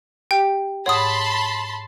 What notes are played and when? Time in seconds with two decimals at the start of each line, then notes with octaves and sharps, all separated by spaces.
0.31 G4 G5
0.86 G#2 C#5 F#5 A5 B5 C6 D#6